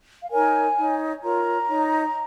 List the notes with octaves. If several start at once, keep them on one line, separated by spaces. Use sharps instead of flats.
F5
D#4 A#4 C#5 G#5
D#4 C#5
F4 A#4 C#5 A#5
D#4 C#5